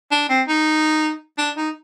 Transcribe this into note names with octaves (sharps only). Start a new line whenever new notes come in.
D4
C4
D#4
D4
D#4